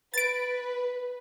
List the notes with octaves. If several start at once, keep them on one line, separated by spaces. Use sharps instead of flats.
B4 A6 D7